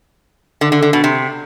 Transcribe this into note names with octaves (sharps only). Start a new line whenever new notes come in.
D3
D3
D3
B2
C3